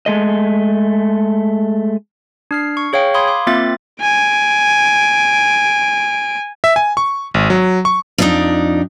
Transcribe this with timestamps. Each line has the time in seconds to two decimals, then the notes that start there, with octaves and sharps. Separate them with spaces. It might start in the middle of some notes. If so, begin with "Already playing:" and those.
0.06 G#3 A3 D#5
2.51 D4 F6 C7
2.77 C#6
2.93 G#4 C#5 F5 G5
3.14 F5 B5 C6 D#6 G#6
3.28 C6 D6
3.47 A#3 C4 F4 E5 A6
4.01 G#5 D7
6.64 E5
6.76 G#5
6.97 C#6
7.34 G#1
7.50 F#3
7.85 C#6
8.18 F2 D4 D#4